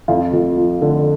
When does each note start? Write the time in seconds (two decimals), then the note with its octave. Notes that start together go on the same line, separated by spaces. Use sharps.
0.08 F2 F4
0.33 F2
0.57 F3
0.82 D3